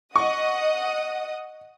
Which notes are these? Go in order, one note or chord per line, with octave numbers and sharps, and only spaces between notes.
D#5 F#5 C#6 D#6